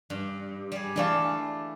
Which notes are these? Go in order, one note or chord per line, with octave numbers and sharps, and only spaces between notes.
G2
G3 G#4
E3 A3 D4 A4 D5 F5